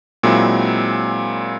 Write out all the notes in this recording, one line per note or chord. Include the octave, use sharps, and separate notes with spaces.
A#2 F#3 G#3 C4 E4